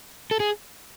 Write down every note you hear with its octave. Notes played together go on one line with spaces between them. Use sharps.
A4
G#4